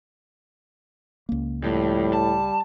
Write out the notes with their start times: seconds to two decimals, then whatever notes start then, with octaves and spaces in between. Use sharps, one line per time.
1.29 C#2 A#3
1.64 F2 A2 G3
2.13 A5